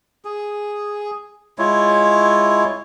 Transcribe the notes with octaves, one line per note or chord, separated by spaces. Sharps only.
G#4
G#3 E4 F4 C#5